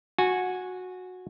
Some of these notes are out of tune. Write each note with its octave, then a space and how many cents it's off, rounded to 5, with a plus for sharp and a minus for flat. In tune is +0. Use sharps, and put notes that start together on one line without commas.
F#4 -15 G#5 +0